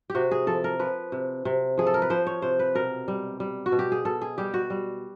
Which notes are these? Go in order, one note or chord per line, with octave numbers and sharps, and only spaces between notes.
G4
C3 F#4
G#4
F3 A4
A#4
F3 B4
C3
C3
F3 G#4
A4
A#4
B4
F3 C5
C#5
C3 C5
B4
B2 A#4
G3
G3
F#4
B2
G4
G#4
B2 A4
G#4
G3 G4
F#4
G3